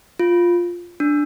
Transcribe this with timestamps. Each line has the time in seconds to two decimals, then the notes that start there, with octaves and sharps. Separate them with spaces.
0.19 F4
1.00 D4